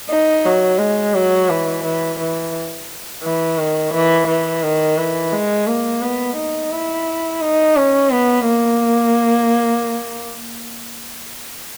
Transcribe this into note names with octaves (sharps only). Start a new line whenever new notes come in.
D#4
F#3
G#3
F#3
E3
E3
E3
E3
D#3
E3
E3
D#3
E3
G#3
A#3
B3
D#4
E4
D#4
C#4
B3
A#3